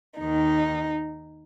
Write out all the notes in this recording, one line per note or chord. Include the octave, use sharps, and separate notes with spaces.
D#2 D#3 D#4